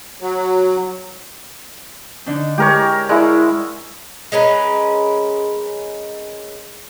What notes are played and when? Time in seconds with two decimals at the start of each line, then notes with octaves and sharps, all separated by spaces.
0.21 F#3
2.26 D3 D4 D#4
2.58 G#3 G4 A#4 C#5
3.09 G#3 E4 D5 F#5 C#6
4.32 G#3 C#4 A#4 B4